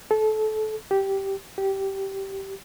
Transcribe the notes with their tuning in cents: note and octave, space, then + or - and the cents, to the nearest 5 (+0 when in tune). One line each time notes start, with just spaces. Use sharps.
A4 -25
G4 -10
G4 -15